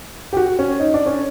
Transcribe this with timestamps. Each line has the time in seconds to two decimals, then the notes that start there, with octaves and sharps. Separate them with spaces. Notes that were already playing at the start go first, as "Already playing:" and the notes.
0.33 G4
0.37 F#4
0.59 C#4
0.80 D#4
0.94 D4
1.06 C#4